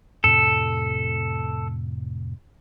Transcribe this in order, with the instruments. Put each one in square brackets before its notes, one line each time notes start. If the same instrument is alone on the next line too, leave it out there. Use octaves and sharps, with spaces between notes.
[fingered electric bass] F2 A2 C3 [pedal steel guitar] A4